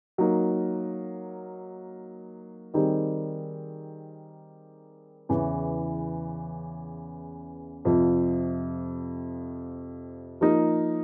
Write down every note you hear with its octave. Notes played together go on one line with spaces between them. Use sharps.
F#3 A#3 D#4
D#3 G3 C4 D#4 G#4
E2 C#3 E3
F2 C3 F3
F3 A#3 D#4